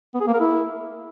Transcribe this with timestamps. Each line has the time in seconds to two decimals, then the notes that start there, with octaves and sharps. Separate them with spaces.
0.14 B3
0.21 G#4
0.27 A#3
0.33 A#4
0.40 E4